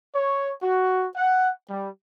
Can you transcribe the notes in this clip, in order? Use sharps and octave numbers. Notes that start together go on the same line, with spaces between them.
C#5
F#4
F#5
G3